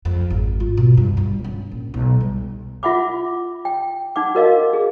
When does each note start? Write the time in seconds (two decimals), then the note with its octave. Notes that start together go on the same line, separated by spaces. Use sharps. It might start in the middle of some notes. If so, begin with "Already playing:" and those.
0.05 F2
0.30 G#1
0.60 F4
0.77 B2
0.97 G2
1.17 G2
1.44 C#4
1.71 A#1
1.94 B1
2.21 G3
2.83 F4 E5 F#5 B5 D6
3.65 G5
4.16 D#4 F#5 D6
4.35 F#4 A#4 D#5 F5
4.73 G#4